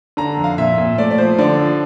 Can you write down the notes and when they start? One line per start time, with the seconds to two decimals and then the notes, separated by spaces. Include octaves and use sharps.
0.17 D3 A#5
0.37 F2
0.44 F5
0.58 A#2 E5
0.78 A#2
0.98 A3 D5
1.11 D5
1.18 F3 C5
1.39 D3 D5
1.59 F3